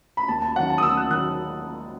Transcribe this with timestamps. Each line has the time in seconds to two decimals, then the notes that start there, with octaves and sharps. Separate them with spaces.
0.17 B5
0.28 D#2 A5
0.42 A5
0.55 D#3 F#3 F#5
0.70 A5
0.78 D#6
0.83 D#2 E6
0.97 F#6
1.10 D#3 F#3 F#6